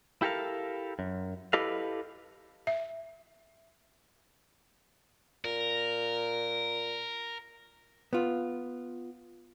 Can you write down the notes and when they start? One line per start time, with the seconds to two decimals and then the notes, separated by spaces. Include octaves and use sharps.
0.22 E4 G4 A4 A#4 F5
0.99 F#2
1.53 E4 G4 A4 B4 D#5 F5
2.67 E5
5.45 A#2 A#4
8.13 B3 F4